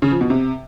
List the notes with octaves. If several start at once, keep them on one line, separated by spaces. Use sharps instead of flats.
C#3
F3
B2
C3